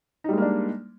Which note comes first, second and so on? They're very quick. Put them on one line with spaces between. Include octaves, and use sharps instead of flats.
D#4 G3 G#3 A#3 D4